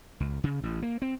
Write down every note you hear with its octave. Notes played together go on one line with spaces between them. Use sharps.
C#2
C#3
A1
A#3
C4